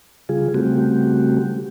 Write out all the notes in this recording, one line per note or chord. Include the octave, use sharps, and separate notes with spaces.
C#3 G3 F4 G#4
C#3 G3 A3 C4 F#4 G4